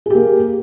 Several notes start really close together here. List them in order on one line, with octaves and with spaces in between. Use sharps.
G#4 G4 A#3